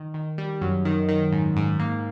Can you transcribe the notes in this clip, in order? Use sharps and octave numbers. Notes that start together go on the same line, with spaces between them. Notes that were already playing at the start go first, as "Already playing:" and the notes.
Already playing: D#3
D#3
G3
F#2
D#3
D#3
G#2
G#2
A#3